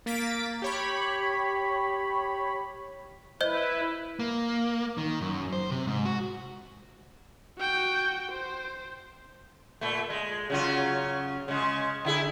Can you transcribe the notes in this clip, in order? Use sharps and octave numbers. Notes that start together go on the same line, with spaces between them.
A#3 A6 B6 D7
G4 C#5 B5
E4 B4 C5 D#5 G6
A#3
D#3
F#2
C5
C3
G#2
F#4
F#4 G5
C5
A#2 A3
G#3
C#3 F#3 F4
C#3 G#3
D3 E4 G#4